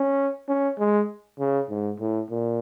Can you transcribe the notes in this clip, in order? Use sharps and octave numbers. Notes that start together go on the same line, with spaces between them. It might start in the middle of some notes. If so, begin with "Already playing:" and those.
Already playing: C#4
C#4
G#3
C#3
G#2
A2
A#2